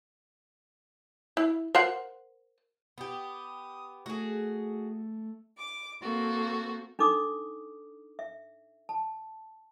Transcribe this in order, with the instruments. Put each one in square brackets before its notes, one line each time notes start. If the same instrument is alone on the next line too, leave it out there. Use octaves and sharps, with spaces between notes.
[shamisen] E4
A#4 C5 F#5
[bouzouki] B3 G4 [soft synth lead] D#6
[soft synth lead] A3 [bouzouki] F#4 G#4
[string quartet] D6
A#3 C4 F#4 A4
[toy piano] D4 D#4 A4 D6 D#6
E5
A5